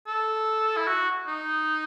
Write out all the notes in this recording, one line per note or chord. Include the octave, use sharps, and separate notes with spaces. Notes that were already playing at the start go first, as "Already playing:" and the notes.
A4
E4
F#4
D#4